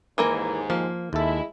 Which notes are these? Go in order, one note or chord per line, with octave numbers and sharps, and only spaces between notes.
D#2 G#2 E3 A#3 A#4
F3 A#3
D#2 G#3 E4 A4